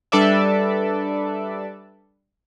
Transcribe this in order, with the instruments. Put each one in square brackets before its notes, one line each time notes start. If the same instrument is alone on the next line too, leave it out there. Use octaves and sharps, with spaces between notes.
[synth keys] G3 D4 A4 B4 D5 E5